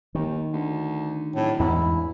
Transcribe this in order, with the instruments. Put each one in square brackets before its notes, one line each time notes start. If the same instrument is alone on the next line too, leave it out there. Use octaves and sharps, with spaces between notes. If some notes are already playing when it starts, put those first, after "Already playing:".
[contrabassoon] D#2 [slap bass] D#3
[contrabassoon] D2
[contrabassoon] D1 [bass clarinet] A2
[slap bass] E2 G#2 [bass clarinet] E4